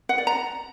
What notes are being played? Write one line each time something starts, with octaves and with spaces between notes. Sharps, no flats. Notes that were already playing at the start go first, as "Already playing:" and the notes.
F#5
D5
A#5